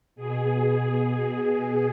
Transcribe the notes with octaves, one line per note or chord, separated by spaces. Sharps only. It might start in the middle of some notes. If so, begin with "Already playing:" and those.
B2 G#4